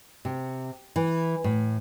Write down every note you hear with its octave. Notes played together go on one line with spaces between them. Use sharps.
C3
E3
A2